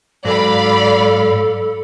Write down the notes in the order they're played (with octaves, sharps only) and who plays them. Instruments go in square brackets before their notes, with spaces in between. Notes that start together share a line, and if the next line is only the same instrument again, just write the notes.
[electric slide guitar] G#2 F#3 [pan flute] A4 [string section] D5 F5 B5